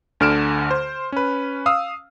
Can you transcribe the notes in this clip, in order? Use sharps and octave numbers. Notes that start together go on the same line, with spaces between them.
D2 D3 F6 D7 E7
C5
C#4 B4
F5 D#6 E6